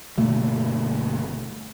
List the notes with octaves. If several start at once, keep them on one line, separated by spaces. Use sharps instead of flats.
G1 B2 A3 A#3